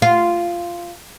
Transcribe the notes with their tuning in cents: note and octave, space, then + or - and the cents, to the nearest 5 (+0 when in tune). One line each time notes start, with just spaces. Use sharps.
F4 -10